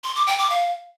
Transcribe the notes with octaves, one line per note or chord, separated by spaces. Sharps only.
C6
D6
G5
D6
F5